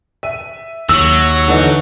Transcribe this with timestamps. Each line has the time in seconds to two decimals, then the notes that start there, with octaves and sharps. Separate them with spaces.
0.23 E5 D#7
0.89 D#2 F#3 E6
1.48 D3 E3 D#4